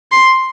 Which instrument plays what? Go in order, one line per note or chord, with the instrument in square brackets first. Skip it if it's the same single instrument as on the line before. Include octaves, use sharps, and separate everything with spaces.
[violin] C6